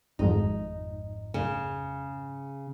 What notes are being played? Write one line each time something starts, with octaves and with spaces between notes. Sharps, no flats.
G#1 F2 G#2 D#4
C#3